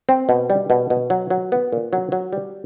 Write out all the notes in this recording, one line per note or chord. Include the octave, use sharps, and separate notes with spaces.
C4
B2
G3
B2
B2
F#3
F#3
B3
A#2
F#3
F#3
G3